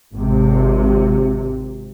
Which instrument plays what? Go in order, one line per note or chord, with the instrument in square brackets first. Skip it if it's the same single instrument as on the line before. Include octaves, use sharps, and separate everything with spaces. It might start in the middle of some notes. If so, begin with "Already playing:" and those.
[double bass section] G#1 C3